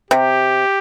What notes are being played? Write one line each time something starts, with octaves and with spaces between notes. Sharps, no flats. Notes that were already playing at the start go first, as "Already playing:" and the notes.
C3 G4